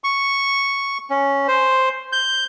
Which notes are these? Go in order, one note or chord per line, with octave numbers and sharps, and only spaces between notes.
C#6
C#4
C5
G6